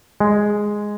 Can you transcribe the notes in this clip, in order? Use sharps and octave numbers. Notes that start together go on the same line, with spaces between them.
G#3